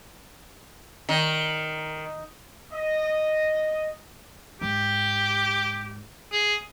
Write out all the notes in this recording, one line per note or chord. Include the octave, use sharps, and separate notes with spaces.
D#3
D#5
G#2 G4
G#4